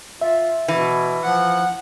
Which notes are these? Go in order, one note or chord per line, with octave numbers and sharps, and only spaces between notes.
F4 E5
B2 E3
F3 F#5